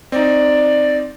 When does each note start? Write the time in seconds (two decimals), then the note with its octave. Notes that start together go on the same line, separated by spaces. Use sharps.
0.12 C4 D#4 D5